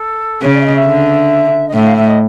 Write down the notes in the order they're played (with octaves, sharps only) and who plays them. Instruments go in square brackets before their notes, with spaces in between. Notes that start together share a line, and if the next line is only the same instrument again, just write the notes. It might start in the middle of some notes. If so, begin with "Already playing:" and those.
Already playing: [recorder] A4
[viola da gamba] C#3 [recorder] C#5
[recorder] D5
E5
D#5
E5
[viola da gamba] D3
[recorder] D#5
[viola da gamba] A2 [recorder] E5
[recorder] F5
E5
D#5